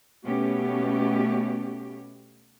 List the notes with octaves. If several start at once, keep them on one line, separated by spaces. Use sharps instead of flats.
B2 A3 B3 C#4 G4